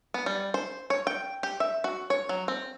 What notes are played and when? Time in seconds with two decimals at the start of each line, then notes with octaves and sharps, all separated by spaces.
0.14 B3
0.26 G3
0.54 C5
0.90 C#5
1.07 G5
1.43 G4
1.60 E5
1.84 F#4
2.10 C#5
2.29 F#3
2.48 C4